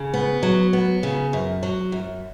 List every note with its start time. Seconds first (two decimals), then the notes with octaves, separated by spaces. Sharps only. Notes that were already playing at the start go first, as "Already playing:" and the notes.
Already playing: C#3
0.14 B3
0.43 F#3
0.73 B3
1.03 C#3
1.33 F#2
1.63 F#3
1.92 F#2